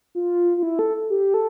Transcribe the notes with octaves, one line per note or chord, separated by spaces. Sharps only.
F4
F4
E4
A4
G4
A4